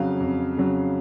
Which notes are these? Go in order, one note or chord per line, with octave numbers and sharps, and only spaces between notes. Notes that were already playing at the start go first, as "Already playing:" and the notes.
Already playing: F2 C#3 F#3 F5
F2
C#3 F#3